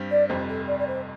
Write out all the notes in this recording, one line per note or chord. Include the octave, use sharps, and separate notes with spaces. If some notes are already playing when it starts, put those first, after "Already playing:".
Already playing: G2 G3 C4
D5
F1 F2 C3 G3 C5
A4
D5
D5
C5